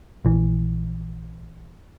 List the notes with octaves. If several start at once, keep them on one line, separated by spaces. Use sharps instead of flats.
A#1 E3